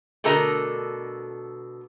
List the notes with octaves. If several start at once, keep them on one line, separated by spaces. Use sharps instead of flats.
B2 D3 A3 A4 A#4 D#5